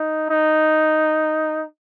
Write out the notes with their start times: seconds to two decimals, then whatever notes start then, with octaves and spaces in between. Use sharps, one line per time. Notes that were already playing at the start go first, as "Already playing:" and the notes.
Already playing: D#4
0.30 D#4